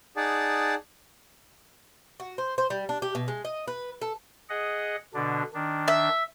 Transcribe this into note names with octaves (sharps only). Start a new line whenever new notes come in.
D#4 G#4 D5 F#5 A5
F#4
C5
C5
G3
D4
G4
B2
G#3
D#5
B4
A4
G#4 D#5 F#5
B2 D3 D4
D#3 D4
E5